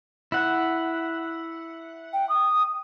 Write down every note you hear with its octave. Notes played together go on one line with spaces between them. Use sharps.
E4 F#5
G5
D#6